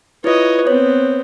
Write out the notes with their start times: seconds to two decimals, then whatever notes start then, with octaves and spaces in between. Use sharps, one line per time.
0.24 E4 F4 B4 C#5 D#5
0.67 B3 C4 C#5